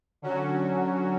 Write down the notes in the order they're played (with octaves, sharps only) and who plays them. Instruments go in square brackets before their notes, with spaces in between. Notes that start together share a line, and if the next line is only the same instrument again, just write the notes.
[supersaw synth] D3 F#3 C#4 F#4